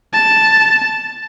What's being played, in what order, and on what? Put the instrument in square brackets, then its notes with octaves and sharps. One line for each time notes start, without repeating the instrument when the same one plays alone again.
[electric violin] A5